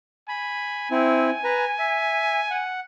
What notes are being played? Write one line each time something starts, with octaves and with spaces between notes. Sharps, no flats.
G#5 B5
C4 E4
B4 A#5
E5
F#5